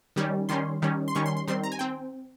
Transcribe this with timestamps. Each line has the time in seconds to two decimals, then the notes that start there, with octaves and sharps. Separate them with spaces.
0.16 D#3 G3 C#4
0.49 D#3 G3 C#4 C6
0.82 D#3 G3 C#4
1.08 C6
1.15 D#3 G3 C#4 C#6
1.26 C6
1.37 C6
1.47 D#3 G3 C4 C6
1.64 A#5
1.72 G#5
1.79 C4 G5